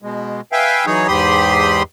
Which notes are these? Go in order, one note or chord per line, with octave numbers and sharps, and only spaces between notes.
B2 G#3
B4 E5 F5 G5 G#5
E3 F#3 D#4 G#4 C#5
E2 G#2 G4 B5 C6 D#6